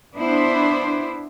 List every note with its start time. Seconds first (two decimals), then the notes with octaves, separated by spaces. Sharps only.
0.14 B3 D4 E4 C5